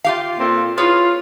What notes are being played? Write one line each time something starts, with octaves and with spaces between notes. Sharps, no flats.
F4 G4 F5
A#2 C4 A4
E4 F4 G#4 B4 C#5